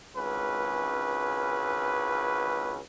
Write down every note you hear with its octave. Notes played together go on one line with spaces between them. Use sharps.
G#1 C#2 C#4 B4